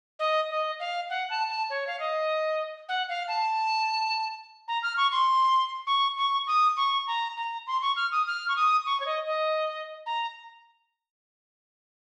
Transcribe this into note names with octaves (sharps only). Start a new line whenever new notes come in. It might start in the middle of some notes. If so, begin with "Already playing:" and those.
D#5
D#5
F5
F#5
A5
A5
C#5
F5
D#5
F#5
F5
A5
A#5
F6
C#6
C6
C#6
C#6
D#6
C#6
A#5
A#5
C6
C#6
F6
D#6
F6
C#6
D#6
C#6
C#5
D#5
D#5
A#5